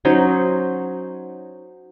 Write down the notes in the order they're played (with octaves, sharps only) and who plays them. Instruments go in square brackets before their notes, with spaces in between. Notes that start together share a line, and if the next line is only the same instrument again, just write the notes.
[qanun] F#3 C#4 D#4 C5